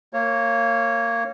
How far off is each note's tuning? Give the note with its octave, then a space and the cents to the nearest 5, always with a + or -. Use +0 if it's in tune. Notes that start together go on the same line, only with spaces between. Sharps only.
A#3 -20 C#5 -15